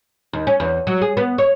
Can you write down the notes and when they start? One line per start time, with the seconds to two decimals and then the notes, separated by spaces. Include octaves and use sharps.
0.33 D#2
0.47 C#4
0.60 E2
0.87 F#3
1.01 G#4
1.17 B3
1.38 C#5